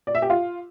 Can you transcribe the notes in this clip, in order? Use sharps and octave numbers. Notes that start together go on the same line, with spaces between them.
D5
E5
G4
F4